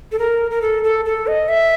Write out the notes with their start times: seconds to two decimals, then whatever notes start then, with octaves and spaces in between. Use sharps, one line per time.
0.12 A4
0.19 A#4
0.51 A#4
0.62 A4
0.84 A4
1.05 A4
1.27 D#5
1.49 E5